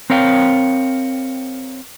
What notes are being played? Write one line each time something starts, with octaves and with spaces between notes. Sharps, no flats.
C4 A#4 C#5 F5 G5